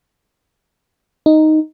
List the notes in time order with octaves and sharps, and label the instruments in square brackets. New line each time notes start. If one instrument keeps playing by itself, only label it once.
[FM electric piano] D#4